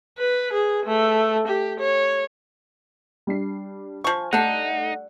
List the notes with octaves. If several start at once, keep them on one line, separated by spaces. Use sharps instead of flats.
B4
G#4
A3
G4
C#5
G3 D4 C7
F3 G#5 C#6
G3 A3 D4 D#4 F#5